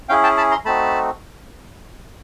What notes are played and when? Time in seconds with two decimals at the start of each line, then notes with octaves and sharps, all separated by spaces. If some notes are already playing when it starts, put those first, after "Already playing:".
0.09 C#4 E4 G#4 F5 G5
0.23 G5 A5
0.37 A5 B5
0.51 A#5 C6
0.65 A3 C4 D#4 F#4 A5 B5